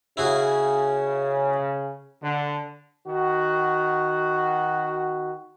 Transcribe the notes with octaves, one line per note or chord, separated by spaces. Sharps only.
C#3 E4 F#4 G#4
D3
D#3 F#4